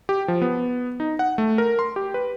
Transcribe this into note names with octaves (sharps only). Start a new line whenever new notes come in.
G4
F3
B3
D#4
F#5
A3
A#4
C6
G4
B4